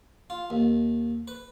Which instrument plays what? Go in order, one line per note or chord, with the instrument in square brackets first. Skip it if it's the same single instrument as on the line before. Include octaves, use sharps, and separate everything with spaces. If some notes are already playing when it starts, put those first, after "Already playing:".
[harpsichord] F4
D#2
B4